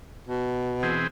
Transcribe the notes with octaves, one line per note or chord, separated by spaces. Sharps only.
B2
E3 C4 G#4